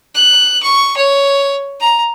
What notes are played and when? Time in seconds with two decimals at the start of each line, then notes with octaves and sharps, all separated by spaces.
0.15 F#6
0.63 C#6
0.97 C#5
1.80 A#5